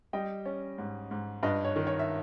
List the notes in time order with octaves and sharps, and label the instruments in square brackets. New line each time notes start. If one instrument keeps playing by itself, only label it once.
[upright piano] G3 D#5 G5
C#4
G#2
G#2
G2 B4 D#5
C#5
D#3
C#5
E5